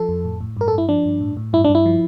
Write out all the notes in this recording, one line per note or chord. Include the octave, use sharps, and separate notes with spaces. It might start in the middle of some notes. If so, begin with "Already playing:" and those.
Already playing: F3 A4
F2
A2
A2
G2 A#4
A4
G2
E4
F3 D4
G2
A2
A2
G2 E4
D4
G2
E4
F3